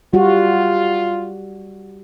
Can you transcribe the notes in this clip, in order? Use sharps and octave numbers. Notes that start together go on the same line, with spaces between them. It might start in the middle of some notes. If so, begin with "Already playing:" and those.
G3 F4 F#4